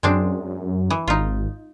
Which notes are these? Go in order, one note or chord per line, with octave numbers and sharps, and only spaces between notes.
F#2 G#3 C4 D4
E3
G#1 D#4 F4